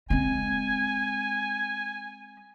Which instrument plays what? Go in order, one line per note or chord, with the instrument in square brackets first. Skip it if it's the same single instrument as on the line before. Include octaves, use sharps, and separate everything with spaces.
[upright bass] G#3 C4 [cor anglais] G#5